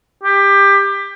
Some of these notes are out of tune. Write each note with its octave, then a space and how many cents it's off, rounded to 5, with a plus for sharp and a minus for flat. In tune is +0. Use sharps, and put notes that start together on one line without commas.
G4 +20